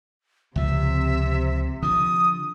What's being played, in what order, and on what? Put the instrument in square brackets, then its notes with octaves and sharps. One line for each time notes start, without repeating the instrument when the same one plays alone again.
[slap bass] C#2 F3 [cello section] C3 [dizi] E5
[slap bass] D3 F3 [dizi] D#6